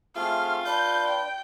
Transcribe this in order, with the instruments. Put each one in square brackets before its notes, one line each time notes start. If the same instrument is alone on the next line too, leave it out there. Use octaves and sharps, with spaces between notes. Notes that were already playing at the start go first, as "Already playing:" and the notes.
[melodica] A3 C4 G#4 [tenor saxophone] F4 [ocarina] E5 [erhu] F6
[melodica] D4 B4 [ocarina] D5 [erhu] G6
[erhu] G5